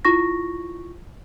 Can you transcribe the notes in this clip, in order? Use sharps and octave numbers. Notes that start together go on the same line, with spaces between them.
E4 F4 C#6 A#6